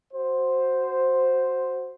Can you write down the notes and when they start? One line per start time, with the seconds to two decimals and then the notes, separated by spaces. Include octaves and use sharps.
0.13 F#4 C5